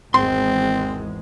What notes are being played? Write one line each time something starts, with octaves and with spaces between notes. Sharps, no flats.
G#1 E2 G#3 C4 C6